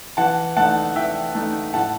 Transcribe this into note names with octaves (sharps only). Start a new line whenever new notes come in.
E3 F#5 A5
A3 D#4 F#5 A5
E3 E5 G5
A3 D#4
A2 F#5 A5